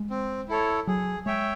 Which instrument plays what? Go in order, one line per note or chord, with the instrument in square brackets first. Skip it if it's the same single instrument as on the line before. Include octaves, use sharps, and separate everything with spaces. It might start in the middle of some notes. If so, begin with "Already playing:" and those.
Already playing: [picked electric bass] G#3
[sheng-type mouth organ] C4
E4 A4 C#5
[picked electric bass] F#3 [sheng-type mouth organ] G#4
[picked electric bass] G#3 [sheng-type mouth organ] C#5 E5 G5